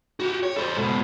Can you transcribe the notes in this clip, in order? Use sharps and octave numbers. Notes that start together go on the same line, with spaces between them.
F#4 G4
C#5
A4 C5
G#2 B2